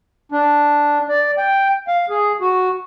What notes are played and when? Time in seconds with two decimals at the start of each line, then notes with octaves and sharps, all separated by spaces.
0.32 D4
1.09 D5
1.38 G5
1.88 F5
2.10 G#4
2.41 F#4